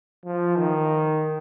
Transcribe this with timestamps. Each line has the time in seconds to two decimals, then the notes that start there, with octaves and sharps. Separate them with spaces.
0.25 F3
0.57 D#3